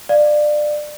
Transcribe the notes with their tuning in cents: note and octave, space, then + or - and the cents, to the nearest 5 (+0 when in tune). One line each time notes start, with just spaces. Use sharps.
D5 +20 F5 +0